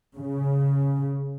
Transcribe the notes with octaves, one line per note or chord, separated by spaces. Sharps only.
C#3